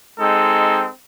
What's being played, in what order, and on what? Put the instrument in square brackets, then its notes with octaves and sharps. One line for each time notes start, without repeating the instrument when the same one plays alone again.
[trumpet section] G#3 C4 D#4 A4